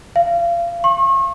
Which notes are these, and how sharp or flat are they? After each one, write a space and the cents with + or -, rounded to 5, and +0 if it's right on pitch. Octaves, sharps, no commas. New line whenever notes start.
F5 -30
C#6 -40